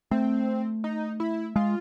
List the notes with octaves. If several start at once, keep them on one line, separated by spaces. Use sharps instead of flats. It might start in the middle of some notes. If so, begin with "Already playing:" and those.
A3 C4
D#4
E4
G#3 F4